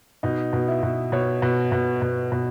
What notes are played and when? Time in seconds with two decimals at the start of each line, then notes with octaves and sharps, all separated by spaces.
0.23 B2 D#4
0.53 B2
0.68 E4
0.83 B2
1.12 B2 C#5
1.42 B2
1.72 B2
2.02 B2
2.32 B2